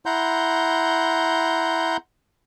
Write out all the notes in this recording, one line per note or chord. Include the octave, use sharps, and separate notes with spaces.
E4 F#5 A#5 C6 G6